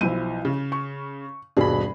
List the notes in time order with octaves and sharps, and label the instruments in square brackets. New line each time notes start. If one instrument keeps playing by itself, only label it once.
[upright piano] B1 [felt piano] F3 E4 D#7
[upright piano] C#3
[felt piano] C#6
[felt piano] D#1 G2 B2 [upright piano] G#4 B5